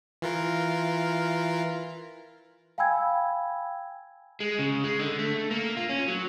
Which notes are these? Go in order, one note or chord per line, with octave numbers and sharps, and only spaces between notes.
E3 F4 A#4
F5 G5 G#5 B5 E6 G#6
G#3
C#3
G#3
D3
A3
A#3
F4
C#4
F#3